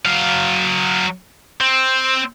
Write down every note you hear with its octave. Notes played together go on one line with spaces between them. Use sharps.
F#3 F5
C4